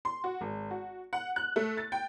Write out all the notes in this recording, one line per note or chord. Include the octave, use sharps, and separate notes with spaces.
C6
F#4
G#1
F#4
F#5
F#6
A3
A6
G5